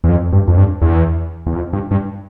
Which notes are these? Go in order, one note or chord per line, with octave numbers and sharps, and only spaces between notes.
E2
F2
G2
F2
G2
E2
E2
F2
G2
G2